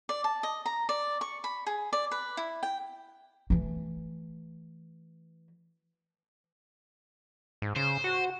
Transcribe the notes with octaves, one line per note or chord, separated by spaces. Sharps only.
D5
A5
D#5
A#5
D5
C#6
B5
G#4
D5
B4
E4
G5
E3 A3
G#2
C#3 C5
F#4